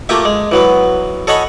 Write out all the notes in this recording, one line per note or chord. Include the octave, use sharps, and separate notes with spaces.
A3 A#3 F4 G4 E5
G#3
E3 F#3 B3
A4 C#5 D#5 F#5 G#5 B5